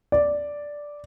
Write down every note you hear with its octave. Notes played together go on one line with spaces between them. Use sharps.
D5